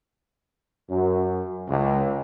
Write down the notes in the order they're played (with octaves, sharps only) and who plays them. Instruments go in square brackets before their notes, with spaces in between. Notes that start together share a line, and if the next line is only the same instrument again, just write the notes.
[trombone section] F#2
C#2